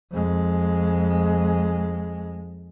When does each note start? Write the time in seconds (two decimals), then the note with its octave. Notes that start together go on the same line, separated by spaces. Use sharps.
0.12 F2 G#3